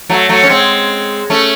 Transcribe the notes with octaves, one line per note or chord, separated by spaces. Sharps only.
F#3 A3
F#3 A3
C#4
G#3 C4
A3 C#4